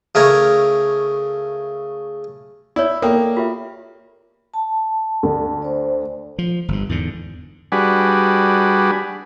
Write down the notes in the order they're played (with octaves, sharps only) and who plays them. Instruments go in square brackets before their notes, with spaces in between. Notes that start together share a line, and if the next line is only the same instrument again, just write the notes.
[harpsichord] C#3 A3 A#4 C#5
[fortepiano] E4 [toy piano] C#5 D5
[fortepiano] A#3 [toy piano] A4 C#5 G5
[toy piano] F4 G4 E5
[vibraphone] A5
[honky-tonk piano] D2
[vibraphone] C5 D5
[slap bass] F3
G1 G2
E2 G#2 D3
[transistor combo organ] G3 D4 F#4 G#4 B4